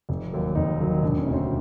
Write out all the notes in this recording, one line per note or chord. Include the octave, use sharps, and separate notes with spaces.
F1
D#2 D#3 F#3
F1 D#4
D#2 D#3 F#3
E1 D4
C#4
D2 C3
C4